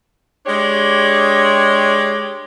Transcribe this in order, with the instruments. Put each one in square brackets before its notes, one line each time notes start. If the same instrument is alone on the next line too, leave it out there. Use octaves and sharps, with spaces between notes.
[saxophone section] G#3 D4 G4 C#5